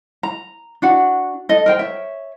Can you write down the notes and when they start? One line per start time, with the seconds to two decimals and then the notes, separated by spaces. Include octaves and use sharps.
0.23 A#5
0.82 D4 F#4 F#5
1.49 A4 D#5
1.66 A#4 C5 G5
1.79 C#5 E5